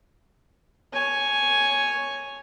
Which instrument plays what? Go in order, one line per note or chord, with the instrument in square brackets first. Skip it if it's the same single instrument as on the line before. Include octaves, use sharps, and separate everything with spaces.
[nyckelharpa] C#5 G#5